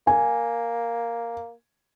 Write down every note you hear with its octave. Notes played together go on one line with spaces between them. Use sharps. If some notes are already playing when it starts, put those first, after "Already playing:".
A#3 G#5